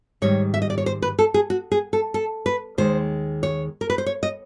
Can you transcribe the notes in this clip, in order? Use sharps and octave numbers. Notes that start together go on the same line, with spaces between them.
G#2 D#3 G3 C#5
E5
D#5
D5
C#5
C5
B4
A4
G#4
F#4
G#4
A4
A4
B4
D#2 D#3 G#3 C5
C#5
A#4
B4
C5
C#5
D#5